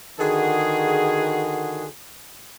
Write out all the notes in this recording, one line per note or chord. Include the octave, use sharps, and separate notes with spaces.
D3 D#3 F#4 G#4